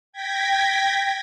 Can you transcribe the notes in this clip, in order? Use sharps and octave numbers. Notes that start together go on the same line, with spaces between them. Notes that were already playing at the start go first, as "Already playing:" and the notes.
G5 G#6 A#6 B6